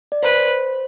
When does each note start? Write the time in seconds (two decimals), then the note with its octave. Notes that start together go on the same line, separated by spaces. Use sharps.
0.12 D5
0.23 B4 C5